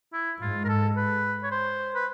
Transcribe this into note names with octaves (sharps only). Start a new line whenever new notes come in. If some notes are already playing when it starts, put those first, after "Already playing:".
E4
G#2 F4
A#4
A4
B4
C#5
C5
B4